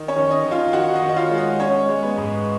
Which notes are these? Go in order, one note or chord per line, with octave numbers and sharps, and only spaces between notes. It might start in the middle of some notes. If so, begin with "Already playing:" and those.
Already playing: D#3
C#4 C#5
D#3
D#4 D#5
D#3
F4 F5
D#3 F#4 F#5
D#4 D#5
D#3
D#5
F4 F5
G#3
D#4 D#5
G#3 C#4 C#5
G#3
B3 B4
G#2